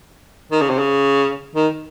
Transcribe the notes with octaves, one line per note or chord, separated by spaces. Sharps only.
D#3
C#3
C3
C#3
D#3